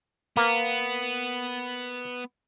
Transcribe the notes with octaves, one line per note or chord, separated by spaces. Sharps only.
A#3 B3